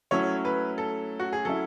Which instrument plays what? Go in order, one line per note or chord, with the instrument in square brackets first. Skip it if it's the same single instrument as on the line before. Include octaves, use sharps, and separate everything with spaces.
[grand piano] F#3 A3 C#4 E4 [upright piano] C#5
[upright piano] B4
A4
F#4
G#4
[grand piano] F#3 C#4 E4 [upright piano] A4